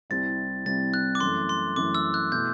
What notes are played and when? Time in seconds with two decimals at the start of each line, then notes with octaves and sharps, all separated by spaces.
0.10 C2 C3 G3 C4 E4 A6
0.65 C2 C3 G3 C4 E4 A6
0.94 F#6
1.15 D6
1.20 F#2 E3 A3 C6
1.49 C6
1.76 F#2 E3 A3 D6
1.95 E6
2.14 F#6
2.32 B2 A3 E4 G6